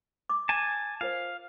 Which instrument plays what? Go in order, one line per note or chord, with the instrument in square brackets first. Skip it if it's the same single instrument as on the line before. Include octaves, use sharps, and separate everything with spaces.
[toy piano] D6
[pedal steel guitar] G#5 A5
[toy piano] F4 A#4 C5 [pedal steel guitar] F5